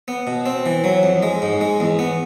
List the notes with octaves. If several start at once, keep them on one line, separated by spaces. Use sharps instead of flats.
B3
B2
C4
E3
F#3
F2
G#3
G#2
G#3
E2
B3